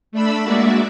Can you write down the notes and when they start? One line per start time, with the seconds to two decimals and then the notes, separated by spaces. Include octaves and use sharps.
0.12 A3 D4 B5 E6
0.44 G#3 A#3 F#4 D5 E5